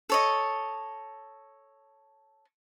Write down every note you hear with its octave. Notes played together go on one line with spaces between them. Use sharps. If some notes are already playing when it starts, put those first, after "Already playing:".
A4 C#5 D#5